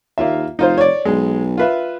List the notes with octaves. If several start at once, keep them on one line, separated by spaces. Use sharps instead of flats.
D#2 A#3 F4 E5
F1 D#4 F4 C5
C#5 D5
B1 G#3
F4 B4 E5